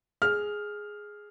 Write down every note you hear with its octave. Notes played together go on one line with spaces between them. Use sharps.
G#4 F6